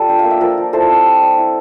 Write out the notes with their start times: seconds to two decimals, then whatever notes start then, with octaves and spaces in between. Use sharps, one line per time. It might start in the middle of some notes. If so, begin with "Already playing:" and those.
Already playing: G3 F4 A4 D5
0.09 D4 G5
0.19 F5
0.24 A#3
0.31 E5
0.41 F3 A#4 D5
0.58 F3
0.73 E4 A4 C5
0.89 C4
1.05 G3
1.22 G3
1.38 E4